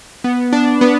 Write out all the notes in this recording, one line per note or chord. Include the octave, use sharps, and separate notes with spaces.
B3
D4
B3